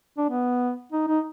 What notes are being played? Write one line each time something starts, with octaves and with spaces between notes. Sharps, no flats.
D4
B3
D#4
D#4